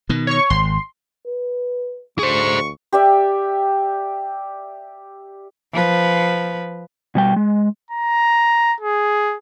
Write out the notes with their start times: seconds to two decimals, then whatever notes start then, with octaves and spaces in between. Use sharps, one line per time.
0.09 B2 D#3
0.27 C#5 C#6
0.50 G#1 C6
1.26 B4
2.19 D2 G#4 C5 C#6
2.93 G4 D5 E5
5.73 F3 B4
7.15 B2 G3 G5
7.36 G#3
7.90 A#5
8.81 G#4